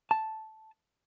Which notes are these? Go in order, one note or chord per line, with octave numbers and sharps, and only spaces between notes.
A5